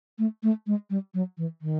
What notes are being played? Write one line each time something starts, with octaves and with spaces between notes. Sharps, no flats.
A3
A3
G#3
G3
F#3
E3
D#3